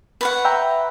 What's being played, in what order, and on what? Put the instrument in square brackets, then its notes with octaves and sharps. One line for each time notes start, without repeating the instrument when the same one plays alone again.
[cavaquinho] B4 C#5 F#5
[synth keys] E5 G5 A#5